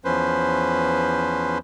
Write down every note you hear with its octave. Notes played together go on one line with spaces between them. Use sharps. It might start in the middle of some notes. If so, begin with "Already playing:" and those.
E2 F3 C#4 B4 C5